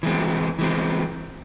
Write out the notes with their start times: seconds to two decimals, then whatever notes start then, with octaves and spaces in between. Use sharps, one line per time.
0.03 E3 G#3 C4
0.59 E3 G#3 C4